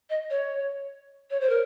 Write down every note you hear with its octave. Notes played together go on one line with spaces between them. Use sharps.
D#5
C#5
C#5
C5
A#4